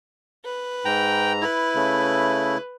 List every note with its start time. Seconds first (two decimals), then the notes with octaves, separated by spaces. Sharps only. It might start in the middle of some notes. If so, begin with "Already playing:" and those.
0.45 B4
0.85 G#2 G5 A#5
1.41 E4 B4
1.76 C#3 A3